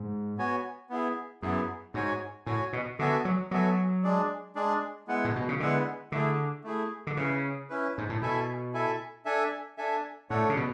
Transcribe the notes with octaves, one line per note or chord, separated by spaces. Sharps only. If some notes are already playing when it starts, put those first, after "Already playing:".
Already playing: G#2
B3 F#4 C#5 G#5
B3 E4 G#4
F#2 B3 E4 G#4
G#2 F#4 C#5 G#5
A2 F#4 C#5 G#5
B2
D3 B3 F#4 A4 E5 G#5
F#3
F#3 B3 F#4 A4 E5 G#5
G#3 D4 G#4 D5
G#3 D4 G#4 D5
G#3 B3 E4 B4 F#5
A2
B2
C#3
D3 G#3 B3 E4 B4 F#5
D3 A3 E4 G#4
A3 E4 G#4
D3
C#3 C#4 E4 B4
C#4 E4 B4
G#2
A2
B2 E4 A4 E5 G#5
E4 A4 E5 G#5
D4 A4 E5 G#5
D4 A4 E5 G#5
A2 A3 D4 A4 C#5 F#5
C#3
B2